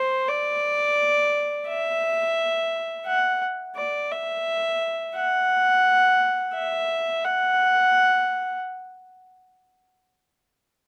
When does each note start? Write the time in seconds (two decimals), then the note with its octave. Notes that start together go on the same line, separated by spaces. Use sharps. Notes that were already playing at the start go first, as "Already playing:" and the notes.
Already playing: C5
0.29 D5
1.68 E5
3.07 F#5
3.77 D5
4.12 E5
5.16 F#5
6.54 E5
7.24 F#5